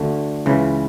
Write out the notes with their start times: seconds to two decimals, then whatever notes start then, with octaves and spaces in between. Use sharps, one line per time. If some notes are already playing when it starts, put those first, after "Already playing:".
Already playing: D2 D3 A3
0.46 C#2 C#3 E3